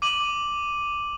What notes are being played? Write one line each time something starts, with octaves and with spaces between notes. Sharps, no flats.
D6 D#7 F#7